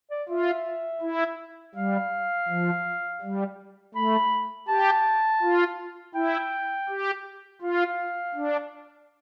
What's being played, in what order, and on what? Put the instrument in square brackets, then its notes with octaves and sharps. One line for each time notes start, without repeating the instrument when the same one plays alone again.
[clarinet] D5
[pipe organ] F4 [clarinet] E5
[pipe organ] E4
[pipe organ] G3 [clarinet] F5
[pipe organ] F3
G3
[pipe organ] A3 [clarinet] B5
[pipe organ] G4 [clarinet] A5
[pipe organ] F4
[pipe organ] E4 [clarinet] G5
[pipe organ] G4
[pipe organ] F4 [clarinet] F5
[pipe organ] D4